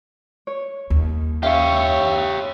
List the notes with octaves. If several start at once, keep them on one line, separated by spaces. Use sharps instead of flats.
C#5
D#2
C#4 G4 C#5 E5 F5